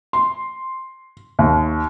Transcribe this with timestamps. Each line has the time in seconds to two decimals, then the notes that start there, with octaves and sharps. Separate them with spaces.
0.13 C6
1.39 D#2